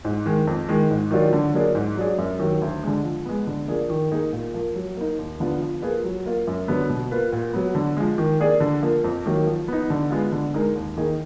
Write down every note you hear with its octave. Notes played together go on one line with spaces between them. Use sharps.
G#2
D#3 G#3
F2
D#3 G#3
G#2
D#3 F#3 D4 F4
D3
F#3 A#3 D4 G#4
G#2
F#3 D4 G#4
F#2
D#3 F#3
D2
D3 G#3
F3
G#3 B3
D3
F3 A#3 D4 G#4
D#3
A#3 D#4 G#4
A#2
F3 A#3
F#3
A#3 D#4
D#2
D3 F3 B3 F4
F3
A#3 F4 G#4 B4
F#3
A#3 F4
F#2
D3 F#3 B3
B2
A#3 F4 B4
A#2
F#3 B3
D3
F3 G#3
D#3
A#3 D4 G#4 D5
D3
F3 A#3
F2
D#3 F#3 A#3
F3
B3 D#4
D3
G#3 B3 F4
D3
G#3 D#4 A#4
D#2
D#3 A#3 D#4 G#4